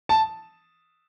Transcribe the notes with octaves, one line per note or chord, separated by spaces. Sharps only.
A5